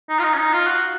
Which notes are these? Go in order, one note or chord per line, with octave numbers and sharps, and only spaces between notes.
D#4
F4
D#4
C#4
D#4
F4
F#4